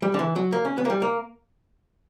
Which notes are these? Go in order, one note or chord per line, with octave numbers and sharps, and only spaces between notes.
G3
D3
E3
F#3
A#3
C#4
B3
A#3
G3
A#3